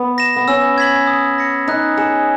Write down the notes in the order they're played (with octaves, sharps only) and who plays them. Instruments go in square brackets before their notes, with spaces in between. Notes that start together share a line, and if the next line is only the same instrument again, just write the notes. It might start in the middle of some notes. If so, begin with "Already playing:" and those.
Already playing: [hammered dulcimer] B3
[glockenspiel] A#6 E7
[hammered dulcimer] B3
[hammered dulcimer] C#4 [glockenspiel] E6
[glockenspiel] G#6 B6 F#7
D#6
A#6 C#7
[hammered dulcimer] D#4 [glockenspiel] F#6
[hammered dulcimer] G#4 [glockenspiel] C#7 E7